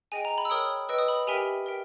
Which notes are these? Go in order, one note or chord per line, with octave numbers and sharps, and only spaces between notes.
G#4 D#5 G5 G#5
A#5
B5
E6
A#4 C#5 G5 D#6
B4 D#5 G5 E6
D#6
B5
G4 A#4 E5 G5 G#5
A#4 E5 G5